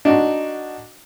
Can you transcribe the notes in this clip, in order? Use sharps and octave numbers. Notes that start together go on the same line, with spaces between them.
D4 D#4 F#4